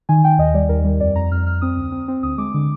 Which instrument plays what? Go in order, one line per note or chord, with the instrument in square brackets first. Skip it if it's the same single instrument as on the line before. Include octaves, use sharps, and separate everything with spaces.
[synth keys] D#3 G#5
D#3 G5
D#2 D#5
G3 D5
D#2 A#4
G3
F2 D5
F2 A#5
F2 F6
F2 F6
C4 D#6
D2
C4
C4
D2 D#6
G#3 D6
D3